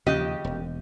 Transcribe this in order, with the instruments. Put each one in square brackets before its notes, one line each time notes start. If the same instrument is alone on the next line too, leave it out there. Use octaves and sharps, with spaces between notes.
[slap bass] D#2 F3 [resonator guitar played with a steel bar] C#3 G4 D#5
[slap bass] E1